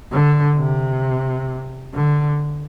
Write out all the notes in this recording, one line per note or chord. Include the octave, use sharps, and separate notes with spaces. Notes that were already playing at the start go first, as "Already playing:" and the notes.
D3
C3
D3